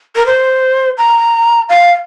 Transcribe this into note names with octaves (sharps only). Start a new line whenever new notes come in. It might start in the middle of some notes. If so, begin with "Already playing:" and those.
A#4
C5
A#5
F5